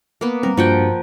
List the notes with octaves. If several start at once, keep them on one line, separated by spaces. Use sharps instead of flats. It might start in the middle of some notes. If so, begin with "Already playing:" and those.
A#3 B3
G3 C4 A#4
G2 F3 A#3 F#4 F#5 G5